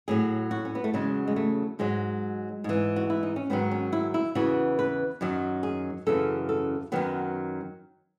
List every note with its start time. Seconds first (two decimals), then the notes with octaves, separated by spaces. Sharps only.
0.08 A2 F#3 G#4
0.51 F#4
0.65 C#4
0.75 B3
0.84 A3
0.94 E2 C#3 F#3 G#3
1.28 G#3
1.36 A3
1.79 G#2 F#3 G#3
2.64 G#2 E3
2.96 F#4
3.10 E4
3.23 D#4
3.36 C#4
3.50 G#2 D#3 F#3 B3
3.71 C#4
3.93 E4
4.14 E4
4.35 E2 C#3 E3 F#4
4.79 B4
5.21 F#2 D#3 F#3
5.63 G#4
6.07 F#2 C#3 E3 A4
6.49 A4
6.92 F#2 D#3 F#3 B3